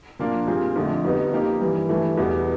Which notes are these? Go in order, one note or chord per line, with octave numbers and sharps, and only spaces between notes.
A#2 F3 A#3 D4
A#2 G3 C4 F4 G#4
F2 D3 F3 A3 C4
F2 D3 G3 B3 D#4
F3 A#3 D#4 G4
G2 E3 G3
G2 E3 A3
E2 B2 G3 B3